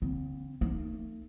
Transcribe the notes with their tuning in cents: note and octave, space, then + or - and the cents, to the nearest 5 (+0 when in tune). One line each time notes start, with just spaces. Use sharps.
D3 -40 C4 +0
A3 +30 D#4 +0